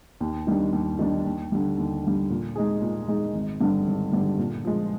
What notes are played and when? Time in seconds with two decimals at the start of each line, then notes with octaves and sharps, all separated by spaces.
0.20 D#2
0.47 D#3 G3 D4
0.73 D#2
0.99 D#3 G3 D4
1.25 D#2
1.52 D3 G3
1.78 D#2
2.04 D3 G3
2.30 A#2
2.56 G#3 D#4 G#4
2.82 A#2
3.08 G#3 D#4 G#4
3.35 G#1
3.61 G2 D3 G3 D4
3.86 G#1
4.13 G2 D3 G3 D4
4.38 A#2
4.65 F3 G#3